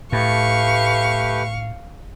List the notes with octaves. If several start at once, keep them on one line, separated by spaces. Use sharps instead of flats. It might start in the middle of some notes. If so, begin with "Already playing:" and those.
A2 A3 G4 B4 F5 C#6